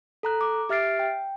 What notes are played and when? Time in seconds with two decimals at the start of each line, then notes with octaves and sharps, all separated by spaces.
0.23 A4 A#5 F#6
0.41 D6
0.69 G4 E5 F6 A6 C7 D7
0.99 G5